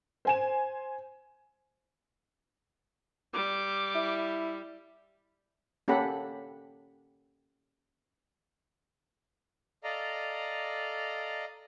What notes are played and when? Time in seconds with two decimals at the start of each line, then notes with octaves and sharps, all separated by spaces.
0.25 C5 G#5 E7
3.34 G3 D6
3.95 E4
5.88 A#3 C#4 G4 A4 F#5 B5
9.84 A4 D5 D#5 F5 A#5